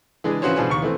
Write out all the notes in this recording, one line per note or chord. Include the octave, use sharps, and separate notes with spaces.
E3 G#3 D4
C#3 E3 F3 F#4 C5 C#5
B2 F3 D4 G#4
D#2 C#6
E3 A3 C4